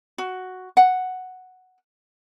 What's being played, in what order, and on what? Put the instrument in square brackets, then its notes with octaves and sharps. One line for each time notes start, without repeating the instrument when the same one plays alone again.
[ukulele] F#4
F#5